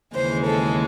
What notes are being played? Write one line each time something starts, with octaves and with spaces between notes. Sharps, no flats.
D#2 C#3 E3 G#3 C5
A4